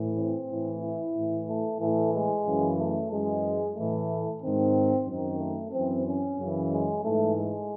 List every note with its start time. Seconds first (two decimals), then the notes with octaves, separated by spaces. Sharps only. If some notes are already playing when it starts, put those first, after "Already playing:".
Already playing: A2 E3
0.17 C4
0.49 A2 E3
0.82 E4
1.15 A2 E3
1.48 A3
1.80 A2 E3 A3
2.13 G#3
2.46 F#2 C#3 E3
2.78 A3
3.10 F#2 E3 G#3
3.76 A2 E3 A3
4.41 G#2 D#3 C4
5.07 F#2 D#3 C4
5.40 A3
5.72 F#2 E3 C4
6.05 C#4
6.38 F#2 C#3 E3
6.71 G#3
7.03 G#2 E3 A3
7.35 G#3